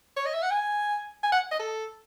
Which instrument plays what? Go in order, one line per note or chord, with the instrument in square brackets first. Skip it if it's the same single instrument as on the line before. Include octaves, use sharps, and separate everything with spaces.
[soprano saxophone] C#5
D#5
E5
F#5
G#5
G#5
F#5
D#5
A4